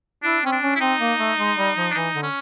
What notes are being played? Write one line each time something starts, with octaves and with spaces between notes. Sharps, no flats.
D4 E4
C4 C#4
D4
C#4
E4
C4 D#4
A#3
A3
G#3
G3
F3
D4
E3 D#4
D3
C#4